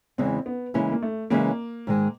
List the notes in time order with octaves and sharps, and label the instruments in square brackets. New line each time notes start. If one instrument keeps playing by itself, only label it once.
[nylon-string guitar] E2 C#3 E3 G#3 [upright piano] C4
[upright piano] B3
[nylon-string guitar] C#3 E3 G#3 C#4 E4 [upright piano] A#3
[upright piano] A#3
A3
[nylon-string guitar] C#3 E3 G#3 C#4 E4 [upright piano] A#3
[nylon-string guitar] G#2 D#3 G#3